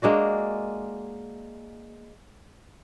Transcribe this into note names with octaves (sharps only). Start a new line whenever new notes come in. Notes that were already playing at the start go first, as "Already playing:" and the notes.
G#3 A#3 D4 F#4